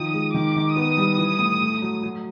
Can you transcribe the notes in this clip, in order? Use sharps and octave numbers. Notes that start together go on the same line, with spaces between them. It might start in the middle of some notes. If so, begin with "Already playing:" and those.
Already playing: D#3 F3 D#6
G#3
D#3 D6
D#3
B3 D#6
G3
E3
A2
A3
F#3
F#3